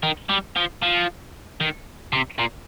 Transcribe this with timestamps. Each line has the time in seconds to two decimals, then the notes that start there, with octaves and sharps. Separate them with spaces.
0.03 D#3
0.29 G3
0.56 F3
0.82 F3
1.60 D#3
2.13 C3
2.39 A#2